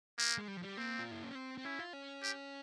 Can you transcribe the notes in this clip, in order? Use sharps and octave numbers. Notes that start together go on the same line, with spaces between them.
A#3
G#3
G3
F3
G3
A#3 C4
F4
E4
C#4
C4
C4
C#4 E4
F4
C#4
G4